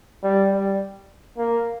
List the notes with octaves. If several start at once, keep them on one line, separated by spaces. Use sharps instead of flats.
G3
G3
A#3